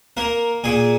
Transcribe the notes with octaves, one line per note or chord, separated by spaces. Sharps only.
A#3 A#4
A#2 G#4